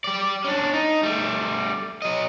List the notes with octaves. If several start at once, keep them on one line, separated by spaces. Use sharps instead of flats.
G4 D5
C#4 D4
D#4
G3 A3
F#3 D#5